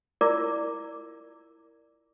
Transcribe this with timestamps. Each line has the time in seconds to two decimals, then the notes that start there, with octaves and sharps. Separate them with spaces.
0.21 E4 F4 A#4 D5 D6